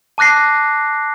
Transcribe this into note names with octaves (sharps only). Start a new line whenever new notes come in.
A5 D6 F#6 A#6 C7